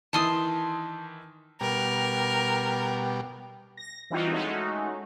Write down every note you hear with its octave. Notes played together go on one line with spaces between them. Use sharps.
D#3 E3 E4 A5 C6 D#6
B2 G3 A#4
A#6
E3 G3 C4 D#4 F4 F#4
G#3 A3 C#4 D#4 F#4